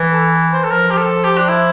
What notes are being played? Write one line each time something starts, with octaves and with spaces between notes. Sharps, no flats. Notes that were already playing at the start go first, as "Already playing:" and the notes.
Already playing: E3
A4
C5
A4
F3 A#4
G4
A4
G4
D4
E4